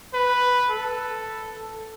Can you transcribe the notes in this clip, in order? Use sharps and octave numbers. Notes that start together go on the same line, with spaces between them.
B4
A4